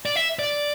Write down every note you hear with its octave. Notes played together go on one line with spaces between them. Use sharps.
D5
E5
D5